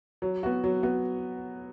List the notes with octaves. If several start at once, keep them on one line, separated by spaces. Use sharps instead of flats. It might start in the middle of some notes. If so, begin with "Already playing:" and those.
F#3
B3 F#4
F#3
B3 F#4